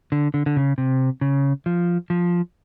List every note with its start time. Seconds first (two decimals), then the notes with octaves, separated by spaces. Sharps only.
0.12 D3
0.34 D3
0.46 D3
0.57 C#3
0.78 C3
1.21 C#3
1.66 F3
2.10 F3